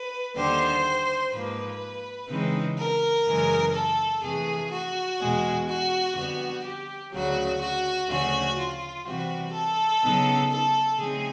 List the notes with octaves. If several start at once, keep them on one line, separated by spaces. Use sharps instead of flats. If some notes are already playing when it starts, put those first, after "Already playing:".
Already playing: B4
D#2 D3 G3 C5
G#2 F3 A#3 B4
C#3 E3 G#3 C4 D#4
A#4
F#2 C#3 E3 G#3
A4
F2 C3 E3 A3 G#4
F#4
E2 B2 G#3
F#4
F2 D3 G3 B3 F#4
G4
D2 C#3 F#3 F#4
F#4
D2 C#3 F3 A3 C#4 F#4
F4
C3 E3 G3 C4 F#4
A4
C#3 F#3 B3 D#4
A4
C#3 F3 A3 C4 D#4 G#4